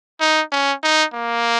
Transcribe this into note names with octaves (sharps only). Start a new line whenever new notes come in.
D#4
C#4
D#4
A#3